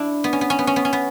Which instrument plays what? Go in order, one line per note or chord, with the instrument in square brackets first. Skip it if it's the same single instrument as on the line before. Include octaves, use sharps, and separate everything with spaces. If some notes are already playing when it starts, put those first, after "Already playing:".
Already playing: [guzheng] D4 E4
B3
C#4
B3
C#4
B3
C#4
B3
C#4
B3